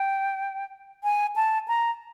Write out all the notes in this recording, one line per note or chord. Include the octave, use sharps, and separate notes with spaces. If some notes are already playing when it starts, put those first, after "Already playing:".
Already playing: G5
G#5
A5
A#5